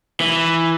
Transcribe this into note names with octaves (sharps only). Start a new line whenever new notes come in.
E3